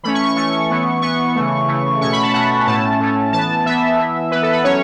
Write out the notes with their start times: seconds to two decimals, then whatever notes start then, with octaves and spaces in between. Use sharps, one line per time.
0.03 E3 A3 C#4 B5
0.14 C#6
0.26 C#6
0.36 E3 A3 C#4 C#6
0.70 E3 B3
1.02 E3 B3 C#6
1.35 C#3 E3 A3
1.68 C#3 E3 A3
2.01 B2 A3 C#4 C#6
2.12 B5
2.23 A5
2.34 B2 A3 C#4 F#5
2.67 A2 A3 C#4 A5
3.00 A2 A3 C#4
3.33 E3 B3 A5
3.65 E3 B3 E5
3.99 E3 B3
4.31 E3 B3 B4
4.42 A4
4.53 B4
4.64 F#3 C#4 C#5